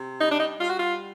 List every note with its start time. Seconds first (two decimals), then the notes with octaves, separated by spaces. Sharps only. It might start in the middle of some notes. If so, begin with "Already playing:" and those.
Already playing: C3
0.20 G3 D#4
0.31 D4
0.39 D#4
0.61 G3 F4
0.69 F#4
0.78 F4